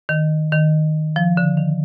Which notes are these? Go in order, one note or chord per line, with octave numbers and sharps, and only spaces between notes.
D#3
D#3
F3
D3
D#3